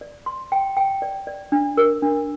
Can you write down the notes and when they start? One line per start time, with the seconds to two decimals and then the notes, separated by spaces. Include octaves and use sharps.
0.01 D5
0.26 C6
0.52 G5
0.77 G5
1.02 D5
1.27 D5
1.52 D4
1.77 A#4
2.02 D4